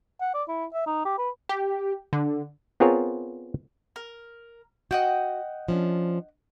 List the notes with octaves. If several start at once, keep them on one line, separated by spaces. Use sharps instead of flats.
F#5
D5
E4
E5
D#4
G4
B4
G4
D3
B3 C4 F4 G#4 A#4 C#5
A#4
F#4 D#5 F#5 G5
F3 C#4 D4